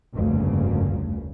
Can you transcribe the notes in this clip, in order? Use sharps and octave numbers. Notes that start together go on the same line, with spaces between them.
F1 D2 G2 C#3 A#3